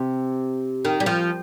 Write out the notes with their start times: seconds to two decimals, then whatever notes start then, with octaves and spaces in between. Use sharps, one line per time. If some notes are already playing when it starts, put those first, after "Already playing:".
Already playing: C3
0.85 D#3
1.00 G3
1.06 F3